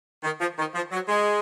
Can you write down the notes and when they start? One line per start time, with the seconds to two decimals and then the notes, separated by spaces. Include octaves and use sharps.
0.24 D#3
0.41 F3
0.58 D#3
0.75 F3
0.92 F#3
1.09 G#3